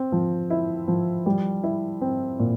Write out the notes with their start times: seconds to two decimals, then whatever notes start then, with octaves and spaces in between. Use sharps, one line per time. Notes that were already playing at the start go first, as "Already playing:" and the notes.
Already playing: C4
0.12 F3
0.50 E4
0.88 F3
1.26 G3
1.63 E4
2.01 C4
2.39 A#2